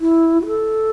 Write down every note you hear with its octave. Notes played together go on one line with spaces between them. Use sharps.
E4
F#4
A4